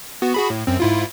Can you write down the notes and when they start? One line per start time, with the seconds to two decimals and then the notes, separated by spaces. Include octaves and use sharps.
0.22 B3 F#4
0.34 F#4 G#4 B5
0.50 A2
0.67 F#2 C4
0.80 G#2 E4 F4